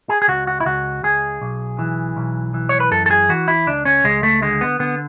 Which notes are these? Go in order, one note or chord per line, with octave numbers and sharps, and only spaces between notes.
G#4
G#4
C#2 F#4
F#4
E4
C#2 F#4
C#2 G#4
B1
E3
B1
E3
C#5
B4
F#2 A4
A4
G#4
E3 F#4
E4
C#2 D4
C#4
C#2 G#3
A3
D3 G#3
B3
D3 B3